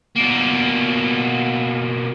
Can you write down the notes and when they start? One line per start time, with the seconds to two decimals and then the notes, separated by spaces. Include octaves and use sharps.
0.16 B2 A#3